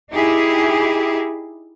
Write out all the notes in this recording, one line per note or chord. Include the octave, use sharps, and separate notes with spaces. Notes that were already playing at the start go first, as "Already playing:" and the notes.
D#4 E4 G4 G#4